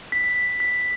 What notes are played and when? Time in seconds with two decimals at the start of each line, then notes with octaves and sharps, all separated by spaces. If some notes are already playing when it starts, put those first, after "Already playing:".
0.12 B6
0.60 B6